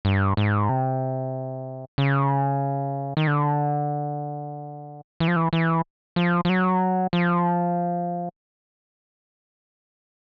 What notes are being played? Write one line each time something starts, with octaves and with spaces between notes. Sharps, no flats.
G2
G#2
C3
C#3
D#3
D3
E3
F3
E3
E3
F3
F3
F#3
F3